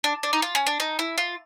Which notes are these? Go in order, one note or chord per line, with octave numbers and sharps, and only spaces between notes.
D4
D4
D#4
F4
C#4
D4
D#4
E4
F4